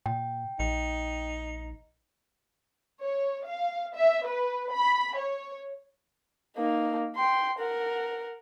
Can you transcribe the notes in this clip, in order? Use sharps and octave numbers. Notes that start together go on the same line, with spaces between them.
A#2 G5
A#1 D#4
C#5
F5
E5
B4
B5
C#5
A#3 D#4
G5 C6
A#4 F#5